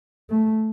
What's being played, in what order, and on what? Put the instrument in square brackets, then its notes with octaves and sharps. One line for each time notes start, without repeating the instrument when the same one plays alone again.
[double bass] A3